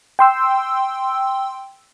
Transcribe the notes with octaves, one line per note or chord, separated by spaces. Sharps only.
G5 C6 E6